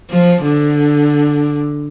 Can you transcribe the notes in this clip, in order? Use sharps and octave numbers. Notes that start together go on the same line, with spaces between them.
F3
D3